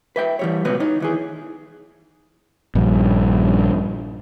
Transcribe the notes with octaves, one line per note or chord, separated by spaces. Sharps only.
B4 E5 G5
E3 G3 C#5
C#2 B2 B3 F#4 B4 C#5
D#4 C#5
D#2 E3 G#4
A#1 G2